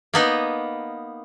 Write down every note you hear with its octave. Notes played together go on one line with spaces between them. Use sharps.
A#3 B3 D#4